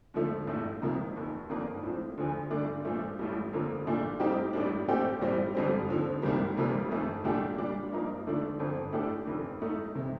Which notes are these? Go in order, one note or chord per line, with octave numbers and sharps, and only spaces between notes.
D#2 D3 F3 A3
A#1 A2 A3
C2 C3 F3 A#3 D#4
F1 D#2 D#3
G1 F2 D#3 A#3 D4
A2 F3 C4
D2 D3 F3
G2 D3 A3 D4
A#2 F3 A3
A1 A2 G3
F2 D3 F3 A#3
C2 A#2 A3 D4
A2 G3 C4 D#4 G4
A1 A2 G3 D4
A#2 A3 C4 G4
A#1 A2 G3 C4
G1 F2 D3 G3 C4
D#2 D3 F3 C4
C2 C3 D#3 G3 A#3
F1 F2 C3 G3 A#3
G1 F2 D#3 A3
C2 A#2 A3 D4 G4
A#2 G3 D4
G2 F3 A#3 D#4
D#2 D3 F3 A3 D4
G1 F2 D3 F3 C4
A2 A3 D4 G4
F1 F2 D#3
A2 A3 D#4
C3